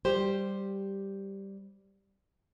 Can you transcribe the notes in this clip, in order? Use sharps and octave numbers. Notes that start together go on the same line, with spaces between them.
G3 G4 C5